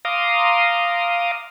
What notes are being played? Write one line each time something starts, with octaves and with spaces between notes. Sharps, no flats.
F5 A#5 C6 D6 D#6